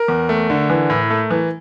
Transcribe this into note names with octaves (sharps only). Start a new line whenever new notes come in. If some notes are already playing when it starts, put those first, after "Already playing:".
Already playing: A#4
E2
A3
D3
E3
A2
A3
E3